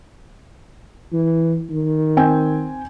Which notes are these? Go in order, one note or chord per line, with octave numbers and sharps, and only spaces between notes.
E3
D#3
C4 G5 G#5